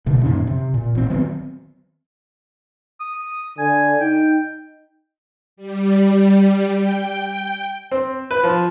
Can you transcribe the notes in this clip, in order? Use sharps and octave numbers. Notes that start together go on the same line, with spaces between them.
D2 B2 D3
F#2 A#2 D#3 C#4
C3
A#2
A1 C4
D#3 F#3 B3 C4
D#6
D3 G#5
D#4 G5
G3
G5
C4
B4
F3